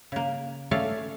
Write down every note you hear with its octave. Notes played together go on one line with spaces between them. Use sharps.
C#3 A#3
A3 C#4 A4 D5 F5